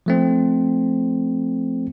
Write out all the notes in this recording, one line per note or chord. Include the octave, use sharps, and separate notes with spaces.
F3 A3 C4